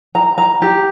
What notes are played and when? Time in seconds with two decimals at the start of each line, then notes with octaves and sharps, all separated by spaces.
0.15 A#5
0.38 A#5
0.62 G4